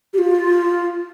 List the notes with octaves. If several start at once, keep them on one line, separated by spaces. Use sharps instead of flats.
G4
F4